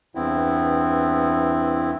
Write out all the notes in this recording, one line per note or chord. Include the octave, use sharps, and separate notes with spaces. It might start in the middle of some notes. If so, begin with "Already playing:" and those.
E2 G2 B3 C4 E4